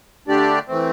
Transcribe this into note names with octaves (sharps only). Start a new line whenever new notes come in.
D3 A3 D4 G4 D5
E3 A3 C4